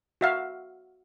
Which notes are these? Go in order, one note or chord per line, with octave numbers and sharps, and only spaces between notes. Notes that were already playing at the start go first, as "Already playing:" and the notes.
F#4 E5 F5